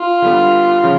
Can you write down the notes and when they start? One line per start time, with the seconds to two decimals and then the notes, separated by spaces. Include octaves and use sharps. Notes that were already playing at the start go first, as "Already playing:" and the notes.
Already playing: F4
0.22 D3 G3 B3
0.83 C#3 F3